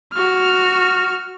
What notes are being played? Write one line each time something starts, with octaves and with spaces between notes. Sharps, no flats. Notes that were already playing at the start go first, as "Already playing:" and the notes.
F#4 F6